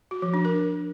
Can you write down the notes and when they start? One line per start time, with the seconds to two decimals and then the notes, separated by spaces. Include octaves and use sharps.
0.11 F#4
0.22 F3
0.34 D4
0.45 A#4